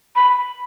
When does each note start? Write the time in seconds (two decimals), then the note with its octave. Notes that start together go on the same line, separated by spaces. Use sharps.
0.16 B5